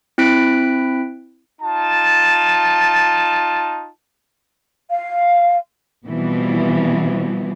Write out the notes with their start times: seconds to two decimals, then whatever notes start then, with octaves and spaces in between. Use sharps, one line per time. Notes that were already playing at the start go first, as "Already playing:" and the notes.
0.18 C4 E4 F#6 B6 D7
1.62 D#4 F4 A5
4.90 F5
6.07 B2 E3 F3 G3 B3 C4